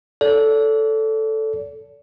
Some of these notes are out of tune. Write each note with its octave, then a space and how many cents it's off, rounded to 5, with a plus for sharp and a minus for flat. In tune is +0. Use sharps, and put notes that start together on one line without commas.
A4 +0 D5 -40